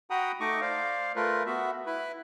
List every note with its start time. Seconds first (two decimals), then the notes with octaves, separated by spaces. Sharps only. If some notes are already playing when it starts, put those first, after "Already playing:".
0.10 F#4 F#5 G5 A#5 B5 D#6
0.40 A3 D#4 D#5 C#6 D6
0.61 C5 D5 F5
1.16 A3 F4 A#4 B4
1.46 B3 F#4 E5
1.87 E4 B4 B5